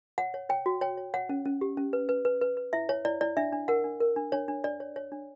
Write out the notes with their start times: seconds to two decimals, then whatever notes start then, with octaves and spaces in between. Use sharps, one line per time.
0.18 C#5 F#5
0.34 C#5
0.49 C#5 G5
0.66 F#4
0.81 C#5 G5
0.97 C#5
1.14 C#5 F#5
1.29 C#4
1.45 C#4
1.61 G4
1.77 C#4
1.93 B4
2.09 B4
2.25 B4
2.41 B4
2.57 B4
2.73 E4 E5
2.89 C#5
3.05 E4 D5
3.21 E4 D5
3.37 D4 E5
3.53 D4
3.68 A#4 F#5
3.84 D4
4.00 A#4
4.16 D4
4.32 D4 C#5
4.48 D4
4.64 D4 D5
4.80 C#5
4.96 C#5
5.12 D4